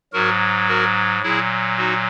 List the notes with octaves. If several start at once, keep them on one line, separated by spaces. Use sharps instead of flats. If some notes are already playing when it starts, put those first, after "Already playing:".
G#2 F#3 F#4 A#4
F#4 A#4
A#2 F#3 E4 G#4
D#4 F#4